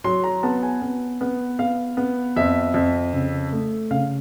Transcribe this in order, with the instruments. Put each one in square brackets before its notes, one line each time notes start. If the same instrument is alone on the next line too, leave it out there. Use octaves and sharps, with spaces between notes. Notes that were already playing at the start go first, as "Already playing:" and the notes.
[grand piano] F#3 C6
A#5
B3 A5
G#5
B3
B3
B3 F5
B3
F2 E5
F2
C#3
A3
C#3 F5